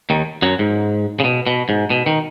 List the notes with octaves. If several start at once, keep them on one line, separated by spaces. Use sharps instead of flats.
D#2 D#3
F#2 F#3
G#2
C#3
B2
B2
G#2
B2
D#3